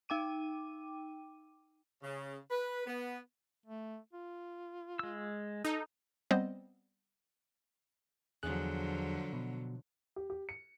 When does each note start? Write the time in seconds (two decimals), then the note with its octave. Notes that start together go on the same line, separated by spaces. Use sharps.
0.09 D#4 G5 D6 D#7
2.03 C#3
2.51 B4
2.86 B3
3.66 A3
4.13 F4
4.99 G#3 E6
5.65 D#4 A4
6.31 G3 B3 C4 C5 D#5
8.43 E2 D3 F3 F#3 G#4 F#6
9.33 B2
10.16 G4
10.30 G4
10.49 C#7